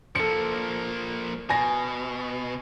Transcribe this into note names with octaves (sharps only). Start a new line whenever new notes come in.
F3 A#3 A4 C#7
B2 G#5 A#6